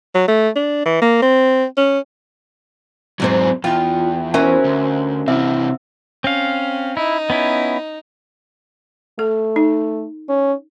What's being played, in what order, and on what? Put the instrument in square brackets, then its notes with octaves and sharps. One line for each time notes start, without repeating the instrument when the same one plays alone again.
[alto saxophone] F#3
A3
D4
E3
A#3
C4
C#4
[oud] E2 G#2 C5 [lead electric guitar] F#3 C4
[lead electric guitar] E2 [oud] F4 [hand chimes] G5
[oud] C#4 F#4 C5 [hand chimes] A#4 E5 G#5
[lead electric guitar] D2
[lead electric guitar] C3 E3 [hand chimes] C4 E5
[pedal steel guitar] C4 F5 [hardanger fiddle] C#4
[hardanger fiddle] D#4 [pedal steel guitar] E4
[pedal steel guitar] B3 C#4 E4
[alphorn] A3 [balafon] A4
[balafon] D#4
[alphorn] C#4